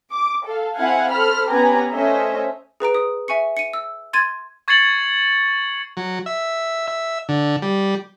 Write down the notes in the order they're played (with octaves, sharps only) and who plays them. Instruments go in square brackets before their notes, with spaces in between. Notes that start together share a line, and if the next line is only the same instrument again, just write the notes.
[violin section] D6
A4 F5
C4 E4 F5 F#5 G#5
A4 C5 B5 F6
B3 C#4 G4 B4 G#5 A#5
A3 C#4 C5 D#5 E5
[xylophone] G#4 B4 A#5 D7
D#6
E5 G#5 C#6 C#7
C#7 D#7
E6
C6 G#6 A6 D#7
[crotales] C#6 G#6 A6 C7 C#7 F#7
[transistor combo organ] F#3
E5
E5
D3
G3